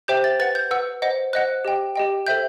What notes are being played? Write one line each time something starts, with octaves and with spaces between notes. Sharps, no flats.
G4 C5 E5 G5 G6
A6
B4 F#5 A6
G6
B4 F#5 E6
C5 D#5 F#5
C5 D#5 F#5 F#6
G4 D#5 G5
G4 D#5 G5
A4 C5 E5 G5 G6